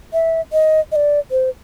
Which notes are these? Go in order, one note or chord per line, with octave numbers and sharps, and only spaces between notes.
E5
D#5
D#5
D5
C5